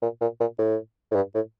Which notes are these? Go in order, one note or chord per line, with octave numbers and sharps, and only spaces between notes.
A#2
A#2
A#2
A2
A2
G2
A2